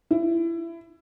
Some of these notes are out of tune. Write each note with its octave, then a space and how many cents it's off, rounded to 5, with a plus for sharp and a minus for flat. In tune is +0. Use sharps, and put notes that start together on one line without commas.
E4 +25